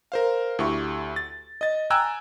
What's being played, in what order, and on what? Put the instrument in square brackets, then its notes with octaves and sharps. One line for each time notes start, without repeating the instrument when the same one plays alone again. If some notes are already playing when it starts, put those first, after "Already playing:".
[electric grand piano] A#4 C5 F5
D2 E4 G4 C#6
A6
D#5 A6
G5 G#5 A#5 E6 F#6 G#6